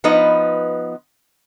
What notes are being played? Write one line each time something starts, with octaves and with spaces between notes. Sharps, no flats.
F3 B3 D#4 B4 D#5